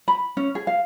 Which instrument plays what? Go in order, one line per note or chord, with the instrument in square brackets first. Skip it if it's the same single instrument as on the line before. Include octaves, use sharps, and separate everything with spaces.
[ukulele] B5
C#4
G#4
F5